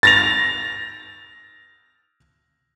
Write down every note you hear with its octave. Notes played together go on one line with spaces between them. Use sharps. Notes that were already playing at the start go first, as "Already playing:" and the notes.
A6 A#6 F7